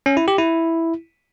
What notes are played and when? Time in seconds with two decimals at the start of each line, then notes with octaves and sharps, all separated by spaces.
0.06 C#4
0.17 E4
0.28 G4
0.38 E4